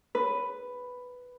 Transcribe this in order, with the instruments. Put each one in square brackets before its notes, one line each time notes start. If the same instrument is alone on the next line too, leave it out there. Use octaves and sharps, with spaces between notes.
[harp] B4